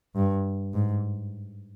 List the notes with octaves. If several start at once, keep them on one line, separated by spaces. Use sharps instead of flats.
G2
G#2